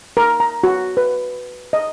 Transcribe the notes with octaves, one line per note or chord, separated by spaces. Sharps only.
A#4
A#5
F#4
B4
D#5